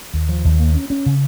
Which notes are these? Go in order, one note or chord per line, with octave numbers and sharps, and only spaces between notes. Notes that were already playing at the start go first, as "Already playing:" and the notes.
D#2
F3
D#2
A#3
C#4
C#4
C#3